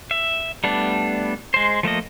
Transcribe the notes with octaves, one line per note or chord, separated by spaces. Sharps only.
E5
G3 A3 B3 D4
G#3 C5
F3 A3 A#3 D#5